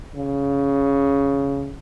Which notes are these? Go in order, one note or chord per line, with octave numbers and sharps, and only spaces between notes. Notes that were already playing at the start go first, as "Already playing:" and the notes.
C#3